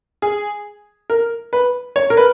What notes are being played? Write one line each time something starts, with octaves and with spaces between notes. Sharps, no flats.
G#4
A#4
B4
C#5
A#4
B4